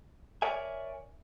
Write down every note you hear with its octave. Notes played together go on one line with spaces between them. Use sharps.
A#4 C#5 D5 E5 G#5